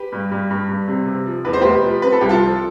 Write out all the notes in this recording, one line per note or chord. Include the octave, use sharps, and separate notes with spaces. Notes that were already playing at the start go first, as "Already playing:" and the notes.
Already playing: G4 B4
G2
G2
G2
G2
C3
C3
F3
E2 B4
C5
F1 G4 B4
F3
C4 B4
A4
C2 G4
F4 A4
F3